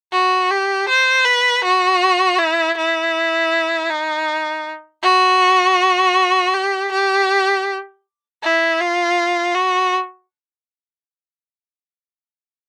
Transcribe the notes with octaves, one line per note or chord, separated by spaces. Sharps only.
F#4
G4
C5
B4
F#4
E4
E4
D#4
F#4
G4
G4
E4
F4
F#4